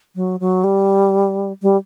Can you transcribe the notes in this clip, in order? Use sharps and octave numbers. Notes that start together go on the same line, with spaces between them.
F#3
F#3
G3
G3